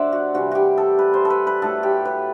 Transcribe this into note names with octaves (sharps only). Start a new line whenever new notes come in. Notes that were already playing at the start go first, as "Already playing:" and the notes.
Already playing: D3 F#3 A3 C5 D5 E5 F#5
F#4
C3 E3 G3 F#4
F#4 G4
A4
B4
C5
A4
B4
B4
A2 F#3 A3 A4
G4
B4